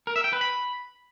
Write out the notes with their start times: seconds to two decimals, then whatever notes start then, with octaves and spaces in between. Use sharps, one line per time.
0.07 A#4
0.16 E5
0.24 G5
0.33 B4
0.41 B5